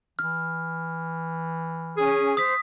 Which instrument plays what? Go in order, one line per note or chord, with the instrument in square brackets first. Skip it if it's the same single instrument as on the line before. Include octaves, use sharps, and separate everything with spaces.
[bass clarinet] E3 [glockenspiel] F6
[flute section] C#4 G#5 [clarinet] G#4
[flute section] C5 [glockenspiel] D#6 B6